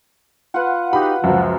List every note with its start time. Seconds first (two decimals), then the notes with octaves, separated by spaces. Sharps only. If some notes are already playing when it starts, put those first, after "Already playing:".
0.54 F4 B4 F#5
0.93 D#4 F#4 G4 B5
1.24 C#2 F#2 F3